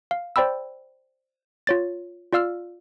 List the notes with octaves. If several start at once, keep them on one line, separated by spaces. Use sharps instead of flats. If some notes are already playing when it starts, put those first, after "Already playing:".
F5
C5 D5 G5 B5 E6
F4 C#5 A6
F4 D5 F5 E6 F6